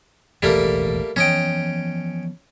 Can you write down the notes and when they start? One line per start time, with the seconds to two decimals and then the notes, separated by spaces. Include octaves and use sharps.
0.43 E1 A1 D#2 G3 A3 A#3
1.16 E3 F3 B3 C#4 D#5 G5